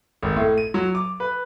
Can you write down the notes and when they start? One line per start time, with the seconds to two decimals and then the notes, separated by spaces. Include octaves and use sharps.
0.23 G#1
0.36 A2
0.58 D#7
0.74 F#3
0.95 D6
1.20 B4